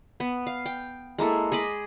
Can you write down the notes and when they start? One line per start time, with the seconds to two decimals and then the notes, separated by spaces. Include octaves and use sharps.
0.20 B3
0.47 F5
0.66 G5
1.18 G#3 A#3 E4 A4
1.52 G#4 D#5 B5 D6